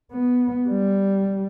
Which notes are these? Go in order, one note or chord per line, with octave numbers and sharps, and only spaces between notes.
B3
G3